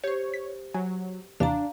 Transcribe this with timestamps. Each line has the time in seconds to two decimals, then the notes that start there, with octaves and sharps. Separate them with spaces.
0.04 G4 C5 C#5
0.34 B6
0.74 F#3 G#5
1.40 D#2 C3 E3 D4 F5 A#5